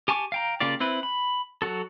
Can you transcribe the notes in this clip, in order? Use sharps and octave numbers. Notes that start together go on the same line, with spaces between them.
G4 G#5 A5 C#6 D6
F5 G5 A#5
C#3 A#3 F4 G4 D5
C4 E4 B4
B5
F#3 F#4 A4